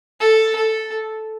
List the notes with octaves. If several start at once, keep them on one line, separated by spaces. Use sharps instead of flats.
A4
A4